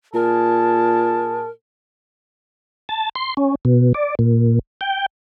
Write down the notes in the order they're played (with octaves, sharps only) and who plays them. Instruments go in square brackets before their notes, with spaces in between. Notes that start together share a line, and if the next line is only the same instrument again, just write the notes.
[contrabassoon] A#2 [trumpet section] G#4 A5 [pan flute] A#4
[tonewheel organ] A5
C6
C#4
B2
D5
A#2
G5